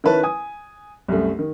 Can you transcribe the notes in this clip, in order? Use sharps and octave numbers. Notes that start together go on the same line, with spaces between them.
D#3 C#4 E4 B4 A5
G#5 D#6
C2 F#2 A3
D#3